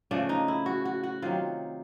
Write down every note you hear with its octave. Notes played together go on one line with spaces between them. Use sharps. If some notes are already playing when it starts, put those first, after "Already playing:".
C#3 F3 A3 D4
D#4
E4
F#4
F#4
F#4
C3 D#3 F#3 F4